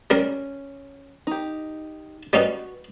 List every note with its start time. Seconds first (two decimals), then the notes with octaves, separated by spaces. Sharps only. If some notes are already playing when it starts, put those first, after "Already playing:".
0.10 G3 C#4 A#4
1.27 D#4 G4
2.33 G3 C#4 D#4 F#4 B4